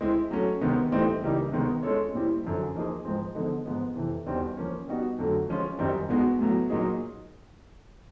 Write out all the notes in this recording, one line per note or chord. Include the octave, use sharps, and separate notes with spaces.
G#3 C4 E4
F#3 A3 C#4
C3 D#3 G#3 B3
A2 E3 G3 C4 D#4
C#3 E3 G3 A#3 D#4
C3 D#3 G#3 B3 D#4
G#3 C#4 F4 A4 C#5
A#2 G3 C4 E4
F#2 D3 F3
F3 A#3 D#4 G#4
G#2 F3 G#3 C4
D3 F3 G#3 B3 D#4
G#2 F3 G#3 B3
F2 C3 E3
E2 B2 G3 C4 D#4
F3 A#3 C#4
G3 B3 D#4 F#4
F2 D3 F#3 A3
F3 G#3 C#4 F4
F#2 D#3 G3 C4 D#4
B2 G#3 B3 D#4 F#4
A2 F#3 B3
A#2 F#3 A#3 D#4 G#4